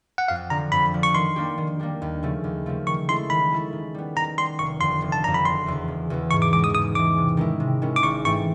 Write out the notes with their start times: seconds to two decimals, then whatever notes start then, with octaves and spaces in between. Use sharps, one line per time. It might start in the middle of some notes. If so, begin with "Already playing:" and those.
0.18 F#5
0.28 F2 F5
0.50 D3 F3 A#5
0.72 F2 B5
0.94 D3 F3
1.03 C#6
1.15 D#3 C6
1.36 G3 A#3 D4 G4
1.58 D#3
1.79 G3 A#3 D4 G4
2.02 D#2
2.23 C#3 F3 A3
2.44 D#2
2.66 C#3 F3 A3
2.87 D#3 C#6
3.09 G#3 C#4 E4 A4 C6
3.30 D#3 B5
3.52 G#3 C#4 E4 A4
3.73 D#3
3.95 G3 B3
4.16 D#3 A#5
4.38 G3 B3 C6
4.59 F1 C#6
4.80 F2 D3 C6
5.02 F1
5.12 A5
5.23 F2 D3 A#5
5.34 B5
5.45 E1 C6
5.66 E2 C#3 E3
5.88 E1
6.10 E2 C#3 E3
6.31 G#2 C#6
6.42 D6
6.52 E3 G#3 D6
6.64 D#6
6.74 G#2 D#6
6.95 E3 G#3 D6
7.18 C3
7.37 D#3 G#3 C#4 E4
7.60 C3
7.82 D#3 G#3 C#4 E4
7.96 D6
8.03 G#1 C#6
8.24 G#2 E3 A3 C4 C#6